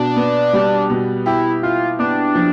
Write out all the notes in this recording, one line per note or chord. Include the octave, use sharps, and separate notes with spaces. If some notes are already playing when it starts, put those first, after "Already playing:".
Already playing: B2 D4
B3
G3
B2
E4 G4
E4 F4
B3 D4
F3